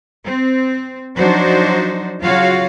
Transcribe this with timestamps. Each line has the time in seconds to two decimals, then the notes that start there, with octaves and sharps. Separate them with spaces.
0.24 C4
1.16 F3 F#3 D4 D#4 F#4 C5
2.21 C#3 F#3 F4 F#4 C#5 F5